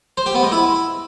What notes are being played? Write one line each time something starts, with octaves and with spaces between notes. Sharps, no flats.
C5
G4
B3
G#3
E4